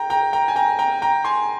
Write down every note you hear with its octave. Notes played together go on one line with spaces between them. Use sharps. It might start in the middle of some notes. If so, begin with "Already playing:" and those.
Already playing: G5 A#5
G5 A#5
G5 A#5
G#5
G5 A#5
G5 A#5
G5 A#5
G#5 C6